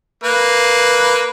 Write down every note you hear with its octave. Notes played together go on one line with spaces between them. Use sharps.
A#3 B4